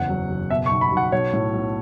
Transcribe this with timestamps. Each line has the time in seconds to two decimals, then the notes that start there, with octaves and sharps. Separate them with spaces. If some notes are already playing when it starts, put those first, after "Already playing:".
Already playing: F#1 E2 F#5
0.09 F#3
0.30 F#1
0.50 B2 E5
0.66 C#6
0.71 B1
0.81 B5
0.92 B1
0.97 F#5
1.12 B1 C#5
1.33 A2
1.53 B1